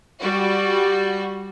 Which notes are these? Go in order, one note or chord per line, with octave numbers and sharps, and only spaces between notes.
G3 F#4